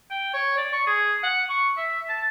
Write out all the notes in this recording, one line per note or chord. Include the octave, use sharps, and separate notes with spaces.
G5
C#5
D5
C#6
G#4
F#5
C#6
E5
A5